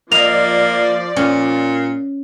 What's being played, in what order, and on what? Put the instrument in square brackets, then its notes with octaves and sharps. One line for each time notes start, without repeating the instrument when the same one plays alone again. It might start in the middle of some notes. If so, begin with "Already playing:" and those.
[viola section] F3 D5 [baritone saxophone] A#3 [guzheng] D#5 [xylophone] F7
[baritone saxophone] A#2 [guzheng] C#4